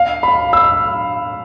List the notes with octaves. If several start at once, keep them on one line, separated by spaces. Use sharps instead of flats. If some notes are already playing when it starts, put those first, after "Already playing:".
Already playing: F5
B5
E6